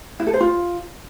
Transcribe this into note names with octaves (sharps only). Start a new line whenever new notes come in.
E4
A4
C5
F4